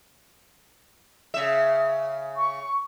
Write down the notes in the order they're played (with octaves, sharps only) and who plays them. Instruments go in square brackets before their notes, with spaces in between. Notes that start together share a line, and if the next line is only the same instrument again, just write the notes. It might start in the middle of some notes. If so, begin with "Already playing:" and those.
[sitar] C#3 E5
[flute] C#6